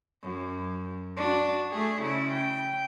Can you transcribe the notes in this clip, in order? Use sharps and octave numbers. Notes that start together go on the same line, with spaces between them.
F#2
D4 F#4
A3 G#4
C#3 E4
G5